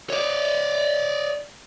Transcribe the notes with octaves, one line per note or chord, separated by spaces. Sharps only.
C#5 D5